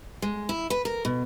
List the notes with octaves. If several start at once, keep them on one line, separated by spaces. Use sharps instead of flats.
G#3
E4
B4
A#4
B2